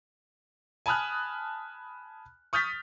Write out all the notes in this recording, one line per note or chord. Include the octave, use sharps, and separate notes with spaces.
G#5 A5 B5 D#6 F6 F#6
C#6 D#6 F6 G6 A6 B6